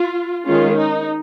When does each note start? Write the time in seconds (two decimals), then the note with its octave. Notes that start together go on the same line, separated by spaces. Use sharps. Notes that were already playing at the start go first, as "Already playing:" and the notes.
Already playing: F4
0.47 D#3 G#3 C#4 F4
0.78 D#4